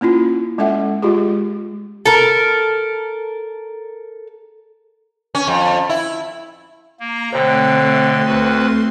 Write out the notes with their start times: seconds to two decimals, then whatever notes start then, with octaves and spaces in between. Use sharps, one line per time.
0.01 A#3 C#4 E4 F4
0.58 G#3 C#4 A4 E5 F#5
1.02 G#3 F4 G4 G#4
2.06 A4 A#4
5.35 C#4
5.47 F2
5.89 E4
7.00 A#3 A#5
7.33 B2 D3 A3 C4 C5 C#5 G5 C6
8.27 D2 F#4 B4